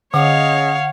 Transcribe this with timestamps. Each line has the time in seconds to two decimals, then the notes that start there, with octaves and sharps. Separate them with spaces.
0.14 D3 C#4 G#4 C#5 D#5 F5 F#5